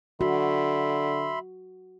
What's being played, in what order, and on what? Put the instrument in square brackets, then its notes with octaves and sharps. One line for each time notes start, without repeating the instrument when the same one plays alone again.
[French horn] D3 [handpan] F#4 [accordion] E5 B5 C6